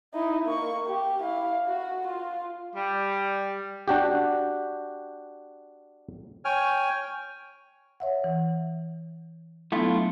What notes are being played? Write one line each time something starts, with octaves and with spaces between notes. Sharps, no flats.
D#4 E4
A#3 C#6
G4
E4 F5
F#4
F4
G3
D4 F#4 G4
C#5 G5 G#5 F6
C#5 E5 F#5
E3
F#3 A3 B3 D4 E4 F4